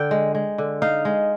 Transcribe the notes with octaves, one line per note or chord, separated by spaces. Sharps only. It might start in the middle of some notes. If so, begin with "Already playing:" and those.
Already playing: D3 G5
G#3
G#3
D3
D#4 F5
G#3